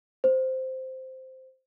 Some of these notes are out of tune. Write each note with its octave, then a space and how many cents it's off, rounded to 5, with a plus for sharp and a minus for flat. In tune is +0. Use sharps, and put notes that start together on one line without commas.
C5 -5